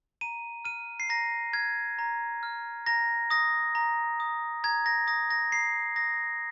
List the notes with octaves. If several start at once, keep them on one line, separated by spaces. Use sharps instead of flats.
A#5 D#7
F6 D#7
C7
A#5 A#6
F6 G#6
A#5
F6
A#5 A#6
D#6 A#6
A#5
D#6
A#5 G#6
A#6
D#6 A#6
A#6
A#5 C7
D#6 A#6